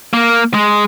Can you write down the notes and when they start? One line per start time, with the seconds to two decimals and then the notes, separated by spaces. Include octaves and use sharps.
0.13 A#3
0.54 G#3